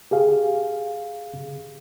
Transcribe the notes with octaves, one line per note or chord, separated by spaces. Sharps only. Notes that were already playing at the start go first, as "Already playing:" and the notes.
G4 G#4 F5